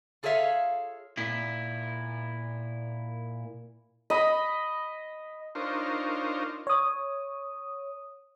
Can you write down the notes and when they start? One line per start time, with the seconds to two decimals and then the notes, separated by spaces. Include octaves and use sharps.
0.23 F4 G#4 A4 C#5 E5 F5
1.17 A#2 E4
4.10 D#5 B5
5.55 D4 D#4 F4 A#4 C5 C#5
6.67 C#5 D#6